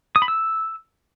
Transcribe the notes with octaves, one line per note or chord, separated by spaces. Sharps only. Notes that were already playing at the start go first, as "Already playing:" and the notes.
D#6
B5
E6